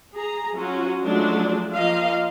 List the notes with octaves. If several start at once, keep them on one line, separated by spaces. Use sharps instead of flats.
G#4 A#5
F#3 C#4 F4 F#4
F3 F#3 G#3 A3 D4
F3 A#3 D#5 F5